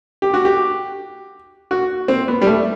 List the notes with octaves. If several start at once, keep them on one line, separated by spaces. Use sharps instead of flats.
G4
F#4
G4
F#4
C4
B3
G3
A3